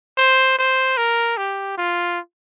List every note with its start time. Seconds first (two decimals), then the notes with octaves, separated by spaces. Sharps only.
0.17 C5
0.58 C5
0.97 A#4
1.37 G4
1.78 F4